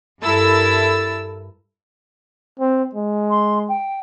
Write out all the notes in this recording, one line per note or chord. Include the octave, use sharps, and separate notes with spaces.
G2 E4 A4 A#4 E6 A6
C4
G#3
C6
G5